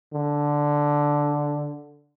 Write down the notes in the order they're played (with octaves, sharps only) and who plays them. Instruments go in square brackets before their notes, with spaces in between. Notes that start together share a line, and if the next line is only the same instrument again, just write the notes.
[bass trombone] D3